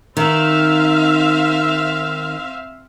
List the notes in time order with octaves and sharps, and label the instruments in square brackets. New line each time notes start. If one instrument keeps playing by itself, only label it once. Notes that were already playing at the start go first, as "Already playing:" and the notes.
[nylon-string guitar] D#3 [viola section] C4 E5 F5